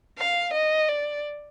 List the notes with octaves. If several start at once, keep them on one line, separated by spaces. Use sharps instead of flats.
F5
D#5
D5